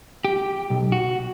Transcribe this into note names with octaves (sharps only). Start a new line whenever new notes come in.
G4
B1
F#4